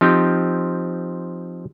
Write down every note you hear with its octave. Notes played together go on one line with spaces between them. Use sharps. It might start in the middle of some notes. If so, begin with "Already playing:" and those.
F3 C4 D#4 G4